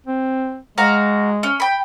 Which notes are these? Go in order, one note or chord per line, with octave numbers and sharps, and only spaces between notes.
C4
G#3 F#4 F5 A#5
C#4
G5 B5